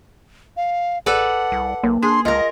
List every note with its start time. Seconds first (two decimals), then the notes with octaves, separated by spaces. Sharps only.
0.57 F5
1.06 A1 A4 B4 D5 F#5
1.52 C2
1.84 B1 A#3
2.02 D4 G#4 C6
2.25 C#2 F4 A#4 D#5